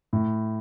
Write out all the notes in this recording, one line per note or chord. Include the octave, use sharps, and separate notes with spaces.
A2